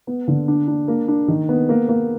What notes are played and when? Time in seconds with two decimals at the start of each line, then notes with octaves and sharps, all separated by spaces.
0.07 B3
0.28 D3
0.48 D4
0.68 D4
0.88 A#3
1.08 D4
1.28 D#3
1.49 B3
1.69 A#3
1.89 A#3